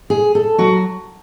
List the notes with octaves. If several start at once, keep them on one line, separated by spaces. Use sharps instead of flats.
G#4
A4
F#3 F#4